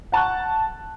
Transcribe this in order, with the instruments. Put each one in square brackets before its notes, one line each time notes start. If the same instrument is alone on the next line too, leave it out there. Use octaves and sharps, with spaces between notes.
[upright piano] F#5 A5 C#6 F#6